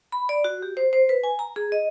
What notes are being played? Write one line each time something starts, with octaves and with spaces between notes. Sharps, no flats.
B5
D5
F#4
G4
C5
C5
B4
G#5
A#5
G#4
D#5